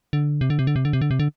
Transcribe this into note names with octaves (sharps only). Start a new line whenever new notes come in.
D3
C3
D3
C3
D3
C3
D3
C3
D3
C3
D3